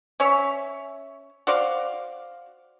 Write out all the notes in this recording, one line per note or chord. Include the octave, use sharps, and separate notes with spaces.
C#4 C#5 E5
F#4 C5 D5 F5